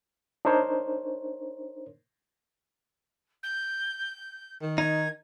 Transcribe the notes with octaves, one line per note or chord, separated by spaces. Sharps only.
D4 D#4 A#4 C5 C#5
G6
D#3
D#4 G#6